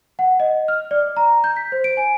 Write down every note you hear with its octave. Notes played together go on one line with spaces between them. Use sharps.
F#5
D#5
F6
D5
A#5
G6
B6
C5
D7
G#5